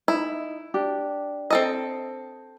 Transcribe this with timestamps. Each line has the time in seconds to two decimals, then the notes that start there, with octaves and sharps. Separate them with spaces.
0.08 D#4 E4
0.74 D4 G4
1.50 C4 A4 D#5